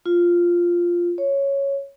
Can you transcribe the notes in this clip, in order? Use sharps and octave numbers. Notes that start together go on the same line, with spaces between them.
F4
C#5